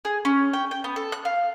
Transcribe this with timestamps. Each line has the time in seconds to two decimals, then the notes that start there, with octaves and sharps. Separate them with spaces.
0.05 G#4
0.25 C#4
0.53 G5
0.71 G5
0.84 B3
0.96 A4
1.12 F#6
1.25 F5